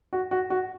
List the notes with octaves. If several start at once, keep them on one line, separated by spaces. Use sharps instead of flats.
F#4
F#4
F#4